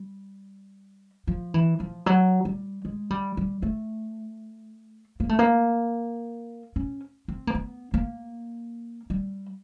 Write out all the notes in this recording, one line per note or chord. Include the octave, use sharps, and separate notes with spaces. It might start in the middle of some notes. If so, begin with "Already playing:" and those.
Already playing: G3
F3
E3
F3
F#3
G3
G#3
G3
G3
A3
A#3
A3
A#3
C#4
C4
A#3
B3
A#3
G3